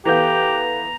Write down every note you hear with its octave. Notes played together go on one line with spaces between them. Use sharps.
E3 B3 G4 A4 F5 A#5 G6